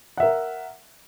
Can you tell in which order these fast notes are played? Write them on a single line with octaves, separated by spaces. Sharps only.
F#5 E5 A#4